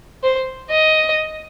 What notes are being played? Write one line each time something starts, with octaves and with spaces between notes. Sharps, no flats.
C5
D#5